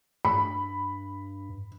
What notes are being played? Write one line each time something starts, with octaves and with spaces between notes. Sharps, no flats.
G2 B5